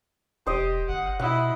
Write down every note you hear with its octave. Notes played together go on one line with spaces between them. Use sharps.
E1 G4 C5 D#5
G1 F#5
B2 E4 D#5 F#5